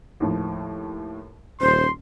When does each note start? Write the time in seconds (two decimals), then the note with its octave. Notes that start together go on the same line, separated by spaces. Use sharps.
0.20 D#2 A2 F3
1.61 D#1 C#4 C5 C6